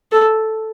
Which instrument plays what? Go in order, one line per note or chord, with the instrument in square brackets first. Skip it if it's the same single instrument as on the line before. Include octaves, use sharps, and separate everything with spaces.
[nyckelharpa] A4